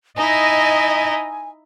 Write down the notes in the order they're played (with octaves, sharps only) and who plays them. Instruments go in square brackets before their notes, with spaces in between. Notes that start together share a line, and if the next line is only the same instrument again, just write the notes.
[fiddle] D#4 E4 [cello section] D#5 [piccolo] G#5